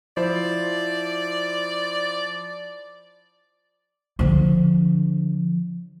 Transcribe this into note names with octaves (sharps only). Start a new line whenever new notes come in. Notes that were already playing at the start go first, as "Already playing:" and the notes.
F3 E4 C5 D5
D3 F3